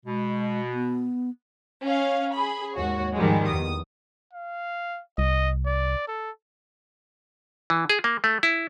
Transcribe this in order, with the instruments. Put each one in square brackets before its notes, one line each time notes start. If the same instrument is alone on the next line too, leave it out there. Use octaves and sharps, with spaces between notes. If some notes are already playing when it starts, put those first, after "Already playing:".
[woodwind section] B2 [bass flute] G#3
[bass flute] B3
[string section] C#4 F5
G#4 B5
D#2 G#2 F#4 C#5
G#2 D#3 F3 G3 G#3
E2 D#6
[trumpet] F5
[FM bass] C2 [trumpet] D#5
[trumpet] D5
A4
[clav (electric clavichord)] E3
G#4
A#3
A3
E4